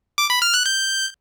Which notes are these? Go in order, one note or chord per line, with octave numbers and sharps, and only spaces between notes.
D6
B5
F6
F#6
G6